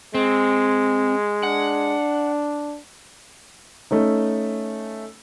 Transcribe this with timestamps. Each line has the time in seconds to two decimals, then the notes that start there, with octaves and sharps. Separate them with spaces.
0.15 G#3 C4
1.43 D4 F#5
3.91 A3 C#4 D#4